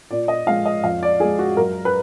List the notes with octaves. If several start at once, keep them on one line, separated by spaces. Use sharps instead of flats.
A#2 D5
D#5
F3 G#3 F5
D#5
F2 F5
D5
F3 G#3 G#4
F#4
F#2 A#4
B4